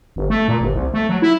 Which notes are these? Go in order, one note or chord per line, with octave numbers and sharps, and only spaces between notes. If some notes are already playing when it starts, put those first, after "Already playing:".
G1
A3
A#2
G1
C2
A3
F#3
E4